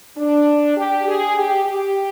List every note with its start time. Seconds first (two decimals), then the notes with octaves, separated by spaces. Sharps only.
0.18 D4
0.77 G4
1.08 G#4
1.38 G4
1.68 G4